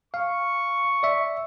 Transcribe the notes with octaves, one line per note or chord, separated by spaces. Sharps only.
F5 C#6
D5 E5